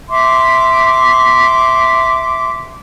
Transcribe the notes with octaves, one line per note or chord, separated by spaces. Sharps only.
E5 C6 D6